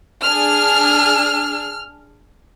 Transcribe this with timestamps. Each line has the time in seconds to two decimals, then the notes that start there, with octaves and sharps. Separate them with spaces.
0.23 D4 G#4 F6